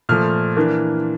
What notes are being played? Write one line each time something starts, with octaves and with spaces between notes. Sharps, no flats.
A#2 F3 A3 F6
E3 A#3 D4